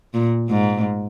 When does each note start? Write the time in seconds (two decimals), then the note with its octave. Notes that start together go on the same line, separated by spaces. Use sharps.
0.14 A#2
0.49 G#2